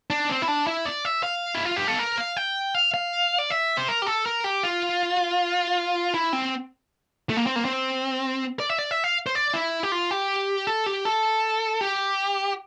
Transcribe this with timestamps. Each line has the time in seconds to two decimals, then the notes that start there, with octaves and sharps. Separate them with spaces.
0.10 D4
0.29 C4
0.42 E4
0.48 D4
0.67 E4
0.86 D5
1.05 E5
1.23 F5
1.55 E4
1.65 F4
1.76 G4
1.88 A4
1.99 A#4
2.18 F5
2.37 G5
2.75 F5
2.94 F5
3.39 D5
3.50 E5
3.77 C5
3.88 A#4
4.02 G4
4.06 A4
4.26 A#4
4.44 G4
4.63 F4
6.14 E4
6.33 C4
7.30 A3
7.37 A#3
7.47 C4
7.56 A#3
7.65 C4
8.60 D5
8.70 E5
8.78 D5
8.91 E5
9.04 F5
9.27 C5
9.35 D5
9.54 E4
9.83 G4
9.92 F4
10.11 G4
10.67 A4
10.86 G4
11.05 A4
11.81 G4